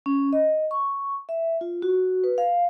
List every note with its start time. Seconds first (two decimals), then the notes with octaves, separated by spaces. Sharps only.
0.06 C#4
0.33 D#5
0.71 C#6
1.29 E5
1.61 F4
1.82 F#4
2.24 B4
2.38 F5